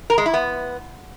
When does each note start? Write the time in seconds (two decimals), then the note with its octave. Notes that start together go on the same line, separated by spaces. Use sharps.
0.10 A#4
0.18 G#3
0.26 E4
0.34 B3